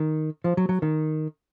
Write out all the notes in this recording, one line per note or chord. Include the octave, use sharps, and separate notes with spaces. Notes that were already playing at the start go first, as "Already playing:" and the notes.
Already playing: D#3
F3
F#3
F#3
D#3